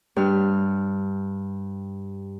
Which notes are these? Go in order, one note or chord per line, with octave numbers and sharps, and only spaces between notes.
G2 F6